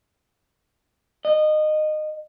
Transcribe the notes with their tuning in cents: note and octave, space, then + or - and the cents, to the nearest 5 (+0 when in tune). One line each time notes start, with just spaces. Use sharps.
D#5 -20